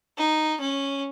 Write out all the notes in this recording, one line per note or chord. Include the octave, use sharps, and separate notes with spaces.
D#4
C#4